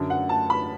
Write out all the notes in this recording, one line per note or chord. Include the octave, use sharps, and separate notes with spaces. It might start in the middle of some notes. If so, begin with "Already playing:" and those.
Already playing: F#2 D3 F#3
F#5
A5
B5